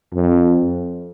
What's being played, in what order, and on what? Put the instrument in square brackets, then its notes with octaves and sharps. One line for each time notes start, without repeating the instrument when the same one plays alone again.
[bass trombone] F2